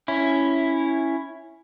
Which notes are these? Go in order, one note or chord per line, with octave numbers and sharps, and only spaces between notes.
C#4 E4